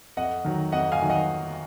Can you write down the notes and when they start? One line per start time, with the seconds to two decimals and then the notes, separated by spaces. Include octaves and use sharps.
0.17 F2 D#5 F#5
0.45 D#3 F#3
0.72 F2 D#5 F#5
0.92 F5 G#5
1.00 D#3 F#3
1.10 D#5 F#5